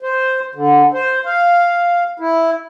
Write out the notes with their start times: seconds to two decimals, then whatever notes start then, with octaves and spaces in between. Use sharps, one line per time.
0.02 C5
0.55 D3
0.93 C5
1.25 F5
2.20 E4